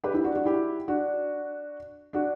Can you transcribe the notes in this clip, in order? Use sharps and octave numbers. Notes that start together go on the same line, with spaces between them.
G4 B4
E4 G4
D4 F#4
D4 F#4
E4 G4
D4 F#4
D4 F#4